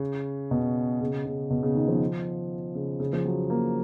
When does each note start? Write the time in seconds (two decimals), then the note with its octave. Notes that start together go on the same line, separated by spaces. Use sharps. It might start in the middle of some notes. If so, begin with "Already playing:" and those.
Already playing: C#3
0.51 B2
1.01 C#3
1.25 C#3
1.50 B2
1.63 C#3
1.75 D#3
1.88 F3
2.75 C#3
3.00 C#3
3.13 F3
3.25 F#3
3.50 A#3